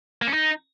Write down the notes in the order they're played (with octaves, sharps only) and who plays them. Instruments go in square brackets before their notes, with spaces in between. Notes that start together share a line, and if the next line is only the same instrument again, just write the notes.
[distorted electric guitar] A#3
C#4
D#4